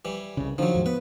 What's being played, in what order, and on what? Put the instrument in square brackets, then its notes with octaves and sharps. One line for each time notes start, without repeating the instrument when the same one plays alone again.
[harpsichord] E3 G3
[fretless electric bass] C2 C#3
[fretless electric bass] D3 D#3 D4 [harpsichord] F3 F#3
[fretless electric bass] D#2 G#2
[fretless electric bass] B3 [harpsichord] B4